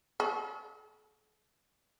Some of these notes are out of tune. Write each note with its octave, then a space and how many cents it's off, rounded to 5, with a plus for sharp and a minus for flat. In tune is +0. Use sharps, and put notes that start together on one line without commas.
A4 -45